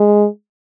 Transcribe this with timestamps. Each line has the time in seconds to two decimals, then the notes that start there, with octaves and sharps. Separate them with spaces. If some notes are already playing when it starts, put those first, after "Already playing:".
Already playing: G#3